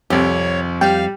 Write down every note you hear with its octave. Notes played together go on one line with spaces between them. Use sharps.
C2 F2 G4 C#5
G3 F5 G5